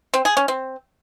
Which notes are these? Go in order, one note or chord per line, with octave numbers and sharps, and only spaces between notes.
C4
G#4
C#4
C4